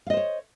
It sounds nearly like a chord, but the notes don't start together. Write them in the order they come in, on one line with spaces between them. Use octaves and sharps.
F5 D#5 C5 C#5